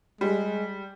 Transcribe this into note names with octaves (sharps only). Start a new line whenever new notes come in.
G3 G#3